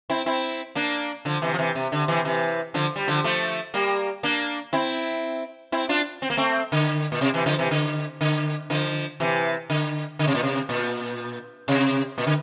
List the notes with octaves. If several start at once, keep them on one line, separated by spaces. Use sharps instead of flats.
C4 E4
C4 E4
A#3 D4
D3 F3
C3 E3
F3
C3 E3
C3
D3
C3 E3
C3 E3
D3 F3
G3
D3 F3
F3 A3
G3 A#3
A#3 D4
C4 E4
C4 E4
D4 F4
C4
A#3
A3 C4
D3
A#2
C3
C3 E3
D3 F3
C3 E3
D3
D3
D3 F3
C3 E3
D3
D3
C3
A#2
C3
A#2
C3
A#2
D3